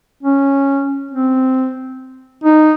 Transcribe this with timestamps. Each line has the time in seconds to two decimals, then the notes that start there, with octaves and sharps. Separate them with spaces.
0.23 C#4
1.11 C4
2.44 D#4